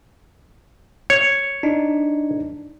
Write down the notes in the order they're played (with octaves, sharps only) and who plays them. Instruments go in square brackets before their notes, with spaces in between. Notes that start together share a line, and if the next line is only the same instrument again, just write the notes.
[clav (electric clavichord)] C#5
[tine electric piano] D4 D#4